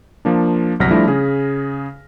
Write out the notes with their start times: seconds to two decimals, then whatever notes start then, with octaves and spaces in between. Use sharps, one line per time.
0.25 F3 A#3 D4
0.80 G1 C2 F#3 F6 A#6 B6
0.91 F3 G3 A3 D4 E4
1.07 C#3 G#4